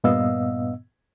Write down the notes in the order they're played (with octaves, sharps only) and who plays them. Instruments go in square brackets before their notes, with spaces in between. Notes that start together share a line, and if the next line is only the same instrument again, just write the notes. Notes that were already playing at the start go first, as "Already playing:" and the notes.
[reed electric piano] G2 A#2 B3 D#5 F5 E6